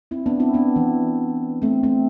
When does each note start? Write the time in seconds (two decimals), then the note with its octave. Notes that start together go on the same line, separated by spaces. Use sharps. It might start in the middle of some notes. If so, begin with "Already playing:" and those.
0.11 C4 E4
0.26 B3 D4
0.40 C4 E4
0.54 B3 D4
0.76 E3
1.62 A3 C4
1.83 A3 C4